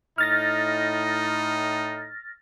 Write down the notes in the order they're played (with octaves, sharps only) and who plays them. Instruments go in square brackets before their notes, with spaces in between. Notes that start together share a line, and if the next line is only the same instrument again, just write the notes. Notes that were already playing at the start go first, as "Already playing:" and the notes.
[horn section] A2 D#4 [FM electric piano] F6 A6 A#6